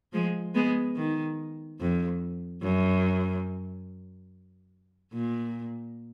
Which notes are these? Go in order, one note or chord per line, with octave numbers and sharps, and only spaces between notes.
F3 G#3
G#3 B3
D#3
F2
F#2
A#2